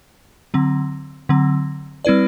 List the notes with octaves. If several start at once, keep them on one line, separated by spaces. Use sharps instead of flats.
D3 F#3 C4
D3 F#3 C4
G3 C4 E4 B4 D5